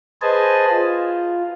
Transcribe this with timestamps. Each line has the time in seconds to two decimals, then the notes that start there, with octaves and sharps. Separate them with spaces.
0.22 G#4 B4 C5 D#5 G#5 A5
0.70 F4